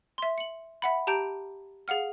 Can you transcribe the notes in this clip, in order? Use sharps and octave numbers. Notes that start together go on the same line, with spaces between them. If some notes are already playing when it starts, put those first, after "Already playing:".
E5 C6
C#7 F#7
E5 F#5 B5
G4 A5 A#5 G6 D7
G#4 F5 F#5 F6